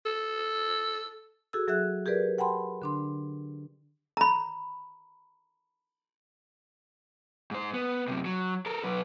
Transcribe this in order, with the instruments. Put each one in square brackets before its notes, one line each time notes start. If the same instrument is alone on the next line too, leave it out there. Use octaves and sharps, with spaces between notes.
[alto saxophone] A4
[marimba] F#4 G#4 A4 E6
F#3 G#4 E5 F#6
G4 G#4 A#4 B4 D5
F#5 G5 A5 B5 C6
D3 D4 C6
[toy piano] A#5 B5
[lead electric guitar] G#2 C5
B3
F#2 C3
F#3
A4 A#4
F#3 B4